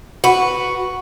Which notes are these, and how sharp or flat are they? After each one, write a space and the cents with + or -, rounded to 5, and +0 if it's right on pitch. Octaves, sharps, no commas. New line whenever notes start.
F#4 +0 B4 +0